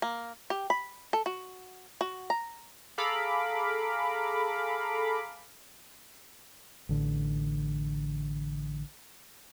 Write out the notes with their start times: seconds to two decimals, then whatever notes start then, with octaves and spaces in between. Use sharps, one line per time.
0.02 A#3
0.50 G4
0.70 B5
1.13 A4
1.26 F#4
2.01 F#4
2.30 A#5
2.98 G#4 A4 F5 A#5 B5 D6
6.89 A1 D3